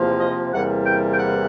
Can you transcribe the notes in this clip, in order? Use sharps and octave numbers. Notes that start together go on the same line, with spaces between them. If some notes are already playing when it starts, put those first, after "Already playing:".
Already playing: E2 C3 F3 A#3
D#5
E2 C3 E3 G3 A#3 F#5
G5
G5
F#5